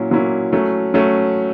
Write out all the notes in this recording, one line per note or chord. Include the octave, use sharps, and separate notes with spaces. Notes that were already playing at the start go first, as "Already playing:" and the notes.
Already playing: A#2 F#3 A#3 C#4 E4
A#2 F#3 A#3 C#4 E4
F#3 A3 C#4
F#3 A3 C#4